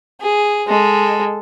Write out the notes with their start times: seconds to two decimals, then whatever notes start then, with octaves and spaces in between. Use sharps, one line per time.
0.21 G#4
0.67 G#3 A4